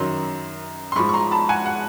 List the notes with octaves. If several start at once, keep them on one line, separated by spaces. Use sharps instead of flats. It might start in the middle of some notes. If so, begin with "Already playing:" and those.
Already playing: F#2 D#3 F#3 A#5 C6
C6
G#2 F3 B5 C#6
C#6
A#5 C6
A5 B5
F#5 G#5
F#5